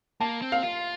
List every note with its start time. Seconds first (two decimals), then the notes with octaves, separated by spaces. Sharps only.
0.20 A#3 A5
0.42 C4
0.52 F5
0.63 F4